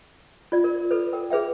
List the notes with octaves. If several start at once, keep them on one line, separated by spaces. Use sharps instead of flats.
F4 D5
A#4
A4 B4
A#4 G5
G#4 B4 E5 G5